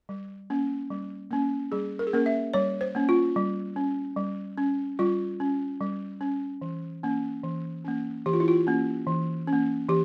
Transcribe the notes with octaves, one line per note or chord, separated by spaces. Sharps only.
G3
A#3 C#4
G3
A#3 C#4
G3 G#4
A#4
G#4
A#3 C#4 A#4
E5
G3 C#5
C5
A#3 C#4
F4
G3
C#4
G3
C#4
G3 F4
C#4
G3
C#4
E3
A#3 C#4
E3
A#3 C#4
E3 G4
F4
E4
F4
A#3 C#4
E3
C#4
A#3
E3 G4